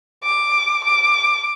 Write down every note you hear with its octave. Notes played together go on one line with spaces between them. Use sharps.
D6
D6